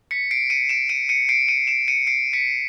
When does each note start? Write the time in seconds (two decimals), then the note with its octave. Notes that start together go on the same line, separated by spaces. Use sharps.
0.11 B6 C#7
0.31 C7 D7
0.50 C#7 D#7
0.69 D7 E7
0.89 C#7 D#7
1.09 C#7 D#7
1.29 C7 D7
1.48 C#7 D#7
1.67 D7 E7
1.88 C#7 D#7
2.07 C7 D7
2.33 B6 C#7